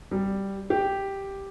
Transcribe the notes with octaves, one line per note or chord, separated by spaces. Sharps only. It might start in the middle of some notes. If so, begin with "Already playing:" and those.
G3
G4